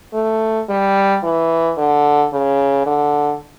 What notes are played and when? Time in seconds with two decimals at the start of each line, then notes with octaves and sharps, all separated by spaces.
0.13 A3
0.69 G3
1.23 E3
1.77 D3
2.33 C#3
2.86 D3